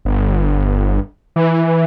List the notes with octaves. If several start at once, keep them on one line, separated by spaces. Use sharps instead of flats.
G1
E3